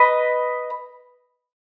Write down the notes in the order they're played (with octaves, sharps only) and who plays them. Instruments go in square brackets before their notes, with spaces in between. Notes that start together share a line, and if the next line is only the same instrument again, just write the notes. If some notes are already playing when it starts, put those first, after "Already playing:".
Already playing: [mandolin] B4 D#5